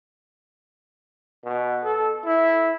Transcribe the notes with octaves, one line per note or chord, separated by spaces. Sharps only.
B2
A4
E4